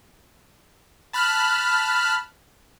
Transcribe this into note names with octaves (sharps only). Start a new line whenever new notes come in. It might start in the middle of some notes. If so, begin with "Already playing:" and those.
A5 B5 F6 F#6